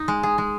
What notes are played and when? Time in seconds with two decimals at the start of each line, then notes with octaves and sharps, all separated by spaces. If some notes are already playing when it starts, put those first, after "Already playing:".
Already playing: D#4
0.08 G#3
0.23 G#4
0.38 G#3